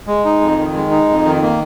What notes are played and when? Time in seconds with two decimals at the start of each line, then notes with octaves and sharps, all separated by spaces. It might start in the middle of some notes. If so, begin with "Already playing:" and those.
0.07 G#3
0.25 D#4
0.41 F2
0.58 D#3
0.74 G#3
0.91 D#4
1.09 F2
1.26 D#3
1.42 A#3